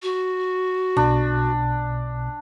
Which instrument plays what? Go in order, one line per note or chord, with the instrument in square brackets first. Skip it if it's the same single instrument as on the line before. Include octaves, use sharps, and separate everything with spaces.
[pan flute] F#4
[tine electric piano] B1 B2 [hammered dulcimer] D4